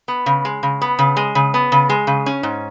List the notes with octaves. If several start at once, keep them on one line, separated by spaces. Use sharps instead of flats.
B3
C#3
G#3
C#3
B3
C#3
G#3
C#3
B3
C#3
G#3
C#3
C#4
G#2